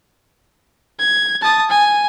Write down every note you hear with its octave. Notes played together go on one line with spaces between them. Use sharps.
G#6
A5 D#6
G#5